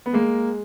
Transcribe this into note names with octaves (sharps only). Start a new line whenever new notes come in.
B3
G#3 A#3